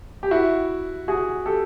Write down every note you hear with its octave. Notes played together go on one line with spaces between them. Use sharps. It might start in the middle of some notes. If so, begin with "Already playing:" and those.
G4
E4 F#4
F#4 G#4
G4 A4